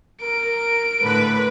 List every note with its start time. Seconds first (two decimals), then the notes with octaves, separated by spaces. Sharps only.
0.21 A#4 D7
1.02 A2 D3 B4